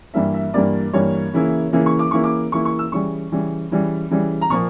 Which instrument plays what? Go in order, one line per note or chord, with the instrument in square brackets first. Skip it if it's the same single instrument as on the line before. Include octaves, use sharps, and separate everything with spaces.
[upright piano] G2 E3 G3 A#3 E5
E5
G2 E3 G3 A#3 D5
G2 E3 G3 A#3 C#5
C#3 E3 A#3 E4
C#3 E3 A#3 E4
C#6
D6
C#3 E3 A#3 E4 C#6
D6
C#3 E3 A#3 E4 C#6
C#6
E6
C#3 E3 G3 C#6
C#3 E3 G3
C#3 E3 G3
C#3 E3 G3
A#5
A#2 F3 A#3 C#6